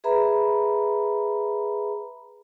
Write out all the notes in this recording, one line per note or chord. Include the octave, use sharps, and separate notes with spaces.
G#4 B4 E5 A#5 B5